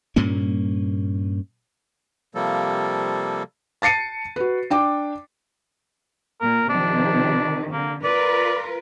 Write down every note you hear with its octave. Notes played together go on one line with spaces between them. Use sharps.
G2 A#2 A#3 C#4
C3 F3 G3 A#3 A4
A5 A6 C7 C#7 D#7
F#4 B4
D4 G5 D6
A#2 A#4
C3 D#3 F3 D4
D3 A#3
F4 A#4 B4 D5